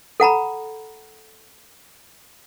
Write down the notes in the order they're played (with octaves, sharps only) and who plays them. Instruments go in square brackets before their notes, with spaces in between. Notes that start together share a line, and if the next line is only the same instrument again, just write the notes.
[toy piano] A4 F#5 A#5 B5